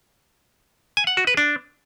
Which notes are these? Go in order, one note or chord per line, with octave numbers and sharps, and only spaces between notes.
G#5
F#5
F#4
B4
D4